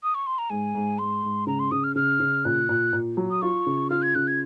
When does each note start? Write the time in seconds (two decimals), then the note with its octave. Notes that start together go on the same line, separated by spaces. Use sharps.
0.03 D#6
0.15 C#6
0.27 C6
0.38 A#5
0.50 G#2 G#5
0.75 G#2
0.98 G#2 C6
1.23 G#2
1.47 C#3 A#5
1.59 C6
1.71 C#3 D#6
1.84 F6
1.95 C#3 F6
2.20 C#3
2.45 A#2 F#6
2.69 A#2
2.93 A#2
3.17 F#3
3.30 D#6
3.42 F4 C#6
3.67 C#3
3.90 F4 F6
4.02 G#6
4.15 C#3 F#6
4.27 G#6